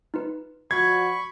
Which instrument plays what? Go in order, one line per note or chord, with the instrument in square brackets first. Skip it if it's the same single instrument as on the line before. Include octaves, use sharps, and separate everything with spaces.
[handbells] D#4 F4 B4
[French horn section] F3 F#4 D5 [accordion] B5 C#6 [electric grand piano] G#6 [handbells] C7